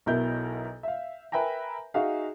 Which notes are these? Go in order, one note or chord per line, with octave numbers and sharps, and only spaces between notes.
B1 B2 E4 A#4 G6
E5 F5
A#4 B4 E5 G5 G#5 A#5
D#4 F#4 G#4 E5 F5